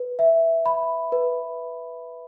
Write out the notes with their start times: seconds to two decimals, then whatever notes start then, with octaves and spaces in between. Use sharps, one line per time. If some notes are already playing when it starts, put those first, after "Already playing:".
Already playing: B4
0.19 E5
0.66 B5
1.12 B4